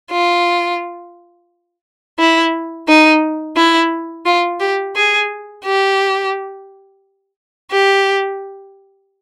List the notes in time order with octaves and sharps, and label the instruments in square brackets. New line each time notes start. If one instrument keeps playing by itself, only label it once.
[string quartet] F4
E4
D#4
E4
F4
G4
G#4
G4
G4